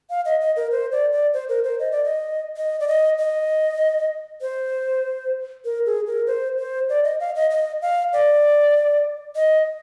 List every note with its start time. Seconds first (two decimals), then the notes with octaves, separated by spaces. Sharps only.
0.10 F5
0.25 D#5
0.41 D#5
0.56 A#4
0.72 C5
0.92 D5
1.12 D5
1.33 C5
1.49 A#4
1.64 C5
1.80 D#5
1.92 D5
2.04 D#5
2.57 D#5
2.80 D5
2.88 D#5
3.19 D#5
4.42 C5
5.65 A#4
5.86 G#4
6.07 A#4
6.27 C5
6.58 C5
6.89 D5
7.04 D#5
7.20 F5
7.35 D#5
7.51 D#5
7.82 F5
8.13 D5
9.36 D#5